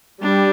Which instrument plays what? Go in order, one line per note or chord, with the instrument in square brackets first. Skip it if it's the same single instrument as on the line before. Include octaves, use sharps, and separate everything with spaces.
[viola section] G3 [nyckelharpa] D4